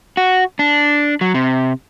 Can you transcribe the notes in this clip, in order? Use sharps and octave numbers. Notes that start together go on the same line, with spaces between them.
F#4
D4
F#3
C3